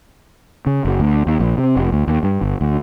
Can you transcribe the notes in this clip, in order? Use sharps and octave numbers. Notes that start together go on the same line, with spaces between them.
C#3
F#1
D2
D#2
A#1
C3
F1
D2
D#2
G2
G1
D2